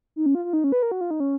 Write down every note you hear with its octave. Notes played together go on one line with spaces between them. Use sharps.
D#4
C#4
F4
F4
D#4
C#4
B4
A#4
F#4
F4
D#4
C#4